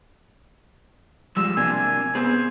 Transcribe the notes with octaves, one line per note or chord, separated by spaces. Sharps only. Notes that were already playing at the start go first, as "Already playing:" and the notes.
F3 G3 G#3 E6
C3 A#3 D4 G#5
B3 C4 G#4 C5